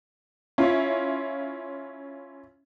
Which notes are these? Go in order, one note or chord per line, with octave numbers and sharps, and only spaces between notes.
C#4 E4 F4